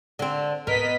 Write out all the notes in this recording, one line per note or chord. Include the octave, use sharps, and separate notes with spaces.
D3 C4
G#2 B3 A#4 D#5 B6